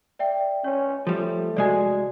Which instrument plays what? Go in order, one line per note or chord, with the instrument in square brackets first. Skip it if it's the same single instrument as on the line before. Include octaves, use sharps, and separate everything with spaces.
[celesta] D5 E5 G5
[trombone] C#4 [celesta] C#5
[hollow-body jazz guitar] F3 G3 [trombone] A3
[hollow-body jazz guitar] C2 G#3 G#5 [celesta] F#4 D5